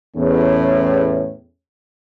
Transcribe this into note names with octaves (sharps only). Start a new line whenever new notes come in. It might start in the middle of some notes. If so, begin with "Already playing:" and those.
E2 A2 C#4